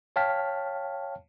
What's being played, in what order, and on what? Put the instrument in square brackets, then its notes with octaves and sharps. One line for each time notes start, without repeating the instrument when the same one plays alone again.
[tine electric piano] C#5 F5 G5 A5 F6 B6